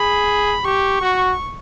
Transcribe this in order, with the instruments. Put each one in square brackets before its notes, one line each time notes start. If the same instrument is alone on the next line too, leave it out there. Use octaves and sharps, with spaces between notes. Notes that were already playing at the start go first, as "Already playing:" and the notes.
Already playing: [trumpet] G#4 [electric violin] B5
[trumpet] G4 [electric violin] C#6
[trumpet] F#4